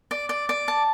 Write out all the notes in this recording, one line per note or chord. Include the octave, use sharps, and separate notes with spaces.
D5
D5
D5
A5